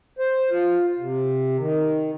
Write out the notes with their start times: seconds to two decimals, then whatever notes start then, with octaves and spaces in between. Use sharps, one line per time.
0.19 C5
0.51 F4
0.99 C3
1.59 D#3